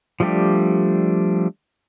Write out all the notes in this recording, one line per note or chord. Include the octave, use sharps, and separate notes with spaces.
F3 G3 A3 D4 G4